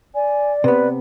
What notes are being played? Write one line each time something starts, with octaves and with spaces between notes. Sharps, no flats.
D5 G#5
C3 B3 B4